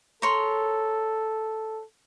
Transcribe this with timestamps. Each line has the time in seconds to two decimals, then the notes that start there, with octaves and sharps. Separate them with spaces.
0.22 A4 A#4 C#5 C6